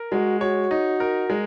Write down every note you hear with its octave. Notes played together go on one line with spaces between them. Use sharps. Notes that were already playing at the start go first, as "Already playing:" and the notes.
Already playing: A#4
G#3 F#4
F#4 C#5
D#4
A#4
G#3